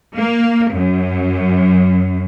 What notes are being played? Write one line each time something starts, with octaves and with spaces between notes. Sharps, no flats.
A#3
F#2